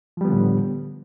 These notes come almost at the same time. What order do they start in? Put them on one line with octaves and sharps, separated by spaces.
F3 G3 B3 D3 A2